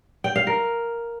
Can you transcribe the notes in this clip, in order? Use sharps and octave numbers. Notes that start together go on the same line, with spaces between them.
G5
F5
A#4